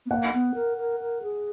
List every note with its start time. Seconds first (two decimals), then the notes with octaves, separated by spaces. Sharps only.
0.06 B3
0.10 A#3 F#5
0.33 B3
0.55 A#4
0.78 A#4
1.00 A#4
1.22 G#4